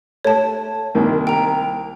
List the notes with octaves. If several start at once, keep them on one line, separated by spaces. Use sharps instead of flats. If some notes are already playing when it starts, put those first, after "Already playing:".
A3 C#5 A5
C2 D#3 A#3
G5 A#5